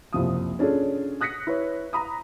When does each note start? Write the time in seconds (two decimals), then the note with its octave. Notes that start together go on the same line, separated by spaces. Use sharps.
0.13 F#1 C2 F3 D#6
0.59 C#4 D4 F4 G#4 A4
1.21 D#6 F#6 A#6 B6 C#7
1.47 E4 B4 C#5
1.93 A#5 B5 D#6